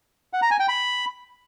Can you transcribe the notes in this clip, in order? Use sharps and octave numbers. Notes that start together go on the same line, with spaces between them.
F#5
A#5
G#5
G5
B5